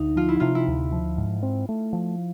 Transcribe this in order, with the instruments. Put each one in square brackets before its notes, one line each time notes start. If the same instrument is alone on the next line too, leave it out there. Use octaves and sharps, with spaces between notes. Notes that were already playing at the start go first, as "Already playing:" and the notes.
Already playing: [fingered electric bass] D2 [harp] D#4
[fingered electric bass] F3 [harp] F4
[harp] E4
[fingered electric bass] C3 [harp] F4
[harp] E4
[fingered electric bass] D2
F3
G#2
C4
A3
F3